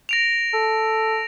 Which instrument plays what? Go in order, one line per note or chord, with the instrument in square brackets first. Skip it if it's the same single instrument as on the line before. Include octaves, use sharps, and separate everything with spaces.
[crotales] A#6 D7 F7
[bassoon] A4